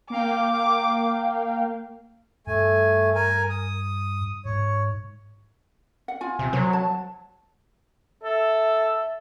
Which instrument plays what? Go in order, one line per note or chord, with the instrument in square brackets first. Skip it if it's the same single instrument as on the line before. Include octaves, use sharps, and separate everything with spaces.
[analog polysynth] A#3 F5 G5 [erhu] D6
[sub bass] G2 [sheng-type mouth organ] A3 G#5
[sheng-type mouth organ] A#4 G#5
D#6
[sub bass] G#2 [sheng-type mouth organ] C#5
[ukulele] F#5
F4 G#5
[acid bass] C3
[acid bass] F#3 [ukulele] C5
[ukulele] A5
[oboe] A4 [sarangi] E5